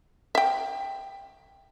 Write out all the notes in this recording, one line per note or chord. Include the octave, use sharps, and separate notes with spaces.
E5 G5